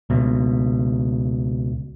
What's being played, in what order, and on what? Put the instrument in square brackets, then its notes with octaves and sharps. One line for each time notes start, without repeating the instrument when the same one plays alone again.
[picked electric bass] C#2 B2